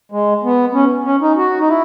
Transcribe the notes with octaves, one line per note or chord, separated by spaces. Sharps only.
G#3
B3
C#4
C#4
D#4
F#4
D#4
E4